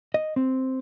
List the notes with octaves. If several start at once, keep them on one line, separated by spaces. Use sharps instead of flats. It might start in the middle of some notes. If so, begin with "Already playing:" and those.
D#5
C4